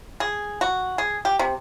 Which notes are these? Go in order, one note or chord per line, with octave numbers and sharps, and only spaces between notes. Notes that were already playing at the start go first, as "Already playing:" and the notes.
G#4
F#4
G#4
G4
C3